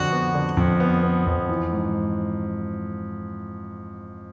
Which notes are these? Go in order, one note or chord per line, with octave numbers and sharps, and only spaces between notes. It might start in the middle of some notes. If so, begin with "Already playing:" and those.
Already playing: F2 D3 F#4
B3
D3
F2
B3
B3
F2
E3
G#2